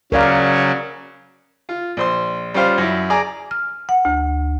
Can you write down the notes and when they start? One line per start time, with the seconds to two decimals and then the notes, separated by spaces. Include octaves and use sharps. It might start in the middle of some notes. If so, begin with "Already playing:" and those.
0.12 C#3 F#3 C#4 A#4 D5 F5
1.69 F4
1.97 A#1 C5 C6
2.54 G3 C#4 F4 C5 F5
2.78 F#2 E4
3.10 G#4 D5 G#5 A#5
3.51 F6
3.89 F#5
4.05 D2